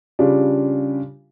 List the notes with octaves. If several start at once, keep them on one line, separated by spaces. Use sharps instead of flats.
C#3 G3 D4 F4